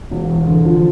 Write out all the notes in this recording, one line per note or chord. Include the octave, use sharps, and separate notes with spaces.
E1
E2
D3
F3